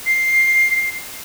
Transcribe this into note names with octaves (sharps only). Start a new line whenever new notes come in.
C7